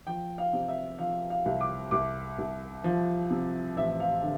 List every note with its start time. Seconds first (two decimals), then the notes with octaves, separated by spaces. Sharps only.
0.07 F3 G5
0.38 F5
0.53 C3
0.68 E5
0.99 F3 F5
1.30 F5
1.46 C2
1.61 D6
1.91 C2 D6
2.38 C2
2.84 F3
3.31 C3
3.76 A1 E5
4.00 F5
4.22 D3